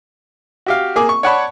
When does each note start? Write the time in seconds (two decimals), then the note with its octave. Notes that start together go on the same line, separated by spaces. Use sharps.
0.66 F#4 G4 F5
0.96 A#3 G#4 D6
1.09 C#6
1.23 C#5 D5 F#5 A5 B5 C#6